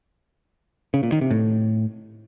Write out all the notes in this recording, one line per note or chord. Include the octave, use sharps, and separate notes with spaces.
C#3
A#2
D#3
C3
A2